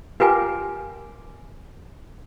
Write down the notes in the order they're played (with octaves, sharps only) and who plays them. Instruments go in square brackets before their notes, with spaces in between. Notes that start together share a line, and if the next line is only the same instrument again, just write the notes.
[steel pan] F4 G4 A#4 [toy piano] B4 G#5